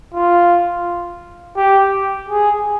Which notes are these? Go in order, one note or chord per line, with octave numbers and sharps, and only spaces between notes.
F4
G4
G#4